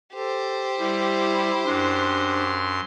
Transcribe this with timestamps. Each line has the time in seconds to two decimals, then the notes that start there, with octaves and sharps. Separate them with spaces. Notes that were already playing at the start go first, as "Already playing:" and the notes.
0.14 G4 A4 C5
0.79 G3 E4
1.66 F#2 D4 C6